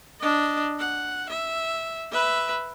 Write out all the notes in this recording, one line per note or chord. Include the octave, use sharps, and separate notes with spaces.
D4 D#5
F#5
E5
B4 E5